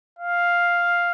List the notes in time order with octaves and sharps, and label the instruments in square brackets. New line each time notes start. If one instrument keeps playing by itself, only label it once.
[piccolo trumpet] F5